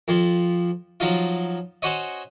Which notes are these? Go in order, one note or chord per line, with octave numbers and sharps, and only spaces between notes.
F2 F3
F3 F#3 D#4 F4
C#4 F#4 C5 C#5 D#5